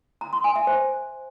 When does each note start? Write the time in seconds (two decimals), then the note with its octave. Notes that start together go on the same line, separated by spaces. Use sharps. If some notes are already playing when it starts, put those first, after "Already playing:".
0.21 A#5
0.33 C6
0.44 G#5
0.56 E5
0.67 C5